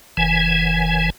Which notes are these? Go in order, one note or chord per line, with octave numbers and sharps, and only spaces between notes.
F#1 E3 G#5